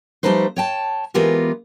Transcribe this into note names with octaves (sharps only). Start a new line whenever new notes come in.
F3 G3 A3 D#4 B4 C5
C#5 G5 A5
E3 G#3 B3 F4 G4 A#4